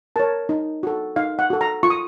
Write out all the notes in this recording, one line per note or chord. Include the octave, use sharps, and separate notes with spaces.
A#4 C#5 A5
D#4
F#4 A4
D#4 F5
F#5
F#4 A4
A#5
F4 C#6
D#6